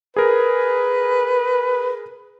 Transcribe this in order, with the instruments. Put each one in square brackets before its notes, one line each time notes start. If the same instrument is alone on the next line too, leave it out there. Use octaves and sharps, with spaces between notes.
[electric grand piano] G#4 A#4 [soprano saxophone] B4